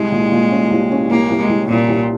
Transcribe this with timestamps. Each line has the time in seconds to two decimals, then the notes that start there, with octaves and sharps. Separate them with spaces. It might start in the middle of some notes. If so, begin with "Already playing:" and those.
Already playing: C2 G#3
0.12 A#2
0.32 A#2
0.51 C#4
0.71 C2
0.91 C#4
1.10 C2 A#3
1.30 C2
1.40 G#3
1.49 C2
1.69 C2 A#2
1.88 C2